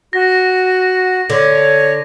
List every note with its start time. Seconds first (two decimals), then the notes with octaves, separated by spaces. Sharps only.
0.13 F#4 A#6
1.30 D3 C#5